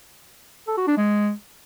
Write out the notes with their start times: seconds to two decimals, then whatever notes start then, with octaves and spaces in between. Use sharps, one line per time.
0.68 A4
0.77 F#4
0.87 D4
0.97 G#3